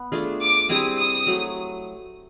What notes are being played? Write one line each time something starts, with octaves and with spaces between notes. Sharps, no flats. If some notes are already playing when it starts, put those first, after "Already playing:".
Already playing: B3
A3 D4 F4 G#4
D6
G3 C4 E4 G#4 D#6
D#6
F#3 A3